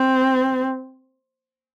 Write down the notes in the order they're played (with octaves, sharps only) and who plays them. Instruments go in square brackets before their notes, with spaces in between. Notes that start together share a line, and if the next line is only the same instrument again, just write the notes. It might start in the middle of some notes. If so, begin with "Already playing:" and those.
Already playing: [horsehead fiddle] C4